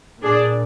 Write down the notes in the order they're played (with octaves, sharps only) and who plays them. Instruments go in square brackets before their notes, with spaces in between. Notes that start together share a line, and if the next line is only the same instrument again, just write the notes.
[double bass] A#2 [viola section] D4 G#4 D5